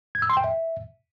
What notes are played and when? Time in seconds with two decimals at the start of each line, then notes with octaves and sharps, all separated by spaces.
0.15 G#6
0.22 E6
0.30 C6
0.37 G5
0.44 E5